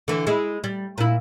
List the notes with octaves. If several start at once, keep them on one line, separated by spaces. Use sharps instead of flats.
D3 E3
G#3 E4
G3
A#2 E4